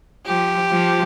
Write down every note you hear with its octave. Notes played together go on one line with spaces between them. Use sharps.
F3 G4
F3